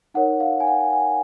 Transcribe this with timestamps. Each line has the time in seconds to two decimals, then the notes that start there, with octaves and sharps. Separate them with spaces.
0.14 D#4 A#4 C#5 F#5
0.40 F5
0.60 G#5
0.67 F#5
0.93 G#5